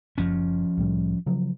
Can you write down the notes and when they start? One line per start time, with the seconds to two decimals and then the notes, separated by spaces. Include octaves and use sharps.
0.18 F#1 F3 C#4
0.77 C2 A2 G3
1.26 C#3 F3 F#3